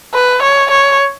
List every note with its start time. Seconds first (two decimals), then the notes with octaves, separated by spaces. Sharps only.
0.14 B4
0.42 C#5
0.70 C#5